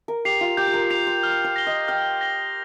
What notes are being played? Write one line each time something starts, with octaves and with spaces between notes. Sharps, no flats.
A#4
G4 C7 F7
F4
G4 G6
C5
A#4
C5 C7 F7
C5
F6
C5
A#6 G7
D#5
G5 F6
A#6 G7